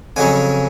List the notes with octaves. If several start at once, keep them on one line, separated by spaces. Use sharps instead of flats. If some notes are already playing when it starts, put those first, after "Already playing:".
F2 C#3 F#3 C#4 G#5